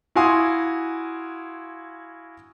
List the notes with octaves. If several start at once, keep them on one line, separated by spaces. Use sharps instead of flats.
E4 F#4 F5 G#5 C6 D#6